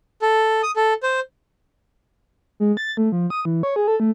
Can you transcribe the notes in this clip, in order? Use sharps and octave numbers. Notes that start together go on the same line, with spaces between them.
A4
D#6
A4
C5
G#3
A6
A3
F3
D#6
E3
C#5
G#4
A4
A3